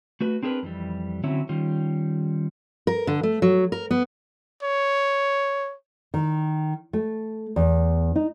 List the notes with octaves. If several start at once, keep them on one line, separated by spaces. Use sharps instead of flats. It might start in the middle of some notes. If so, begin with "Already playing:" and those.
A3 F#4 B4
C4 D4 G#4 A#4 B4
F2 E3 G3
D3 F#3 C4 C#4 E4 E5
D#3 G3 C#4 F4
A#4
D3
A3
F#3
A#4
B3
C#5
D#3
A3
E2
D#4